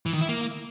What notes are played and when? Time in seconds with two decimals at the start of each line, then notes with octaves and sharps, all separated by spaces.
0.06 E3
0.13 D#3
0.21 E4
0.29 A#3